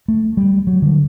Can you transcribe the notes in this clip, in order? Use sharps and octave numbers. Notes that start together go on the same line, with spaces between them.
A3
G3
F#3
D3